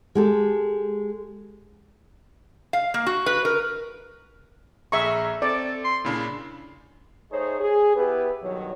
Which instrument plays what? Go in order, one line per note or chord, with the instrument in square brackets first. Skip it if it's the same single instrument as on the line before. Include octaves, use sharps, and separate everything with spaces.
[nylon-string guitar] G#3 G4 A4
[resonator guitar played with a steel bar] F5
A#3
F#4
B4
A#4
[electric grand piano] A#1 G#4 A#5 [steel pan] E5 C#6
[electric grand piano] C4 [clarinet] A4 [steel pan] D5
[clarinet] C6
[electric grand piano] A#2 C#3 D4 [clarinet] E4
[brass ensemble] A3 D#4 G#4 C5 C#5
G#4
B3 E4 G4 G#4 B4
B1 G2 D#3 F#3 C#5